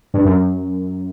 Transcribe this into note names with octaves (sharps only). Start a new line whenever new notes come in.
G2
F#2